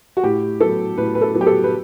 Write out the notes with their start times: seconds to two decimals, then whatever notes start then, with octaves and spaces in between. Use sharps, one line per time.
0.17 F#4
0.24 A2 G4
0.61 F#3 B3 A4
0.98 A2 B4
1.15 B4
1.22 A4
1.35 F#3 B3
1.41 G4
1.47 A4
1.64 B4